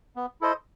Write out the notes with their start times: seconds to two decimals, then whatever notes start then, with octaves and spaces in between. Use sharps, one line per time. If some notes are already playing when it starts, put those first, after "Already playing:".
0.16 B3
0.41 E4 A4 C5 D#5